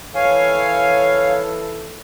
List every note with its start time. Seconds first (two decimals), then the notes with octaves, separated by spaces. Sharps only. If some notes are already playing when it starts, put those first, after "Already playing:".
0.15 E3 A4 B4 C#5 F5 G#5